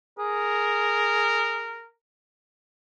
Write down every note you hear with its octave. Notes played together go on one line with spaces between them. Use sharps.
G#4 A#4